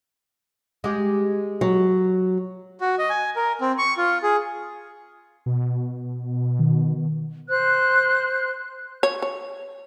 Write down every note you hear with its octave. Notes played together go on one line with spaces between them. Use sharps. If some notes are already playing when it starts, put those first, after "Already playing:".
G#3 G4
F#3
F#4
D#5
G#5
A#4
C4
C#6
F4
G#4
B2
D#3
C5 F#6
C#5
C#5